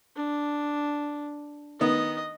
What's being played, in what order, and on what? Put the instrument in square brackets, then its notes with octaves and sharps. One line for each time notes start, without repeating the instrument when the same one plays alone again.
[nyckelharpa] D4
[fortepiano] D#3 B3 [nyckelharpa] D#5